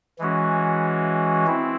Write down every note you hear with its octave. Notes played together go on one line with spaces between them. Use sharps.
E3 G#3 C#4 F#4
C4 E4